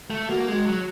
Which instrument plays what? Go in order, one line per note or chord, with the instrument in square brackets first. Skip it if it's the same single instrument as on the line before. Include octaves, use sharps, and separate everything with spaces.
[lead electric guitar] A3
[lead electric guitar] A#3 [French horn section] F#4
[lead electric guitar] G#3
F#3